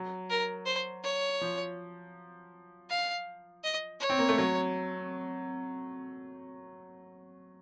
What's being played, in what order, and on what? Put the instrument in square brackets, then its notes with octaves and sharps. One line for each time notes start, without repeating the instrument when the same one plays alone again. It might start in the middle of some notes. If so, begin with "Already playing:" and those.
Already playing: [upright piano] F#3
[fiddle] A#4
C5
C#5
[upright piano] F3
[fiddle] F5
D#5
C#5
[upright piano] C4
A#3
A3
F#3